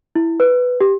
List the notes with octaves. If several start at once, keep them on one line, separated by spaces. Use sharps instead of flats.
E4
B4
G4